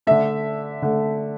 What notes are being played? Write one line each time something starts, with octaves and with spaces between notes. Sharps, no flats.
D3 A3 E5
D3 A3